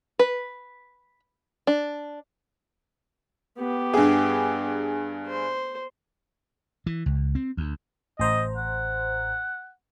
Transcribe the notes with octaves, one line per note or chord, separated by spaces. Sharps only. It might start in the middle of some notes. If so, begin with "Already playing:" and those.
B4
D4
B3 G4
G2 G#4
C5
E3
C#2
C4
D2
A1 C5 D#5 A#5
F#5